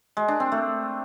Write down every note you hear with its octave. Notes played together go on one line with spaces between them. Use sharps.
G#3
D4
C4
A3